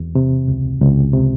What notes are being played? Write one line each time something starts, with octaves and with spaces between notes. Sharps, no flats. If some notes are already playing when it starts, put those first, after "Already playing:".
Already playing: E2
C3
C#2
C#2
C3